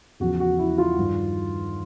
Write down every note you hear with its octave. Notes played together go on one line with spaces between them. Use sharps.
E2 C#3 F3 F#4
F#4
E4
F4
G2 D#3